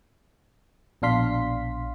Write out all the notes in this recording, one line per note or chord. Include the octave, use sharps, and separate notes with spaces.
A#1 B2 D4 F5 C6 B6